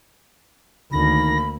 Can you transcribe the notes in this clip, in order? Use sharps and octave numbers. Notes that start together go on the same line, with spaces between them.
D2 D#3 A#3 B5 A#6